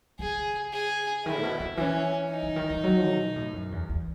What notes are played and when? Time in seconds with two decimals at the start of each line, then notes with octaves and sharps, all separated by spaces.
0.19 C#3 G#4
0.72 G#4
1.25 D#3 E4
1.37 A2
1.43 B2
1.60 C#3
1.77 E3 C#4
2.30 D#4
2.43 C#3
2.56 D#3
2.70 E3
2.84 F#3
3.10 B2
3.36 A2
3.53 F#2
3.72 E2
3.89 E2